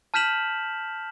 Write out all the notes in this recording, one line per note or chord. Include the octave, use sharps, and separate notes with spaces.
A5 F6 G6 B6 E7 F#7